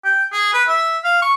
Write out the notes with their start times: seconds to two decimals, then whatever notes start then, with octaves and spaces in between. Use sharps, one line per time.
0.04 G5
0.32 G#4
0.53 B4
0.68 E5
1.04 F5
1.22 C#6